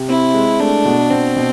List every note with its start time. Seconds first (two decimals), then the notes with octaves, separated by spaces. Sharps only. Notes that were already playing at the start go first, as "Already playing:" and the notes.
Already playing: C3
0.09 C4 E4
0.34 G#3
0.60 A3 D4
0.85 B2
1.11 B2 C4
1.36 B2